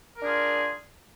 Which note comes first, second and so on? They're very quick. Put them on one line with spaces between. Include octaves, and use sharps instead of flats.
A#4 D4 G#4 F4